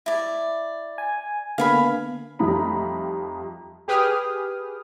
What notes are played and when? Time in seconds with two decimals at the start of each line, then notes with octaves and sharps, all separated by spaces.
0.06 E4 D5
0.98 G#5
1.58 D3 A#3 B3 F5 G#5 B5
2.39 F2 G3 A3 D#4 A#5 B5
3.88 G4 G#4 B4 G5 D#6 F6